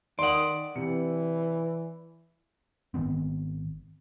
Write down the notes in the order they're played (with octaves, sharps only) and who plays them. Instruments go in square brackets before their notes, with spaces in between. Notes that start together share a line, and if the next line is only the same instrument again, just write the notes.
[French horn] D#3 [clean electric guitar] D5 F#5 [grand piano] C6 D#6
[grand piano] C3 C#7 [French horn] E3
[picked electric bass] G#1 D#3 B3 C4